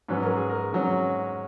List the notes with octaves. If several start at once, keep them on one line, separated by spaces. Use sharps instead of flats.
G#2 F#3 C#4 B4
A#4
G#4
A#4
G#2 F#3 C#4